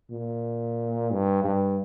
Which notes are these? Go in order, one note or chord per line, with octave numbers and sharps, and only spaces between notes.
A#2
G2
G2